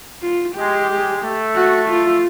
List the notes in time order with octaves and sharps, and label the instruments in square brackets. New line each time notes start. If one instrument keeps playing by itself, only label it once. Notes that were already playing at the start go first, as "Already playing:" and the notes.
[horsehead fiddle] F4
[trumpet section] G#3 [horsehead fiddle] G4
[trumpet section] G#3
A3
[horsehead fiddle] F#4
F4